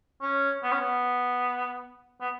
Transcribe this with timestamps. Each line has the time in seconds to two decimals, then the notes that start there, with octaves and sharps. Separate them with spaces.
0.21 C#4
0.63 B3
0.72 C#4
0.80 B3
2.21 B3